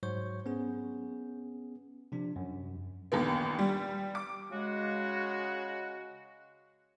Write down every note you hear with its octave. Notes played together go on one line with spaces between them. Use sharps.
G#2 F#3 C5 C#5 C#6 G6
B3 C#4 G#4
C3 F3 D4
F#2
A#1 D#2 B3
G3
D6
C#3 G#3 F#4